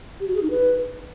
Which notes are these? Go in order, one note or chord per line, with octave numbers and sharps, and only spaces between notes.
G4
F#4
G#4
D#4
B4